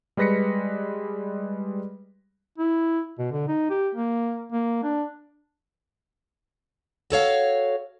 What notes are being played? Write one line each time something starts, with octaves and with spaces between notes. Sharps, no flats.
G3 G#3 B4 A#6 B6 C#7
E4
B2
D3
D#4
G4
A#3
A#3
D4
F#4 A4 C#5 F5